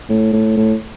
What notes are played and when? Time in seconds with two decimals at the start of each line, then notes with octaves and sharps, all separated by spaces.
0.09 A2
0.33 A2
0.57 A2